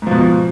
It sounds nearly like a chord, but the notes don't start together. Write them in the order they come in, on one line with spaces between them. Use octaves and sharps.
G#2 F3 B2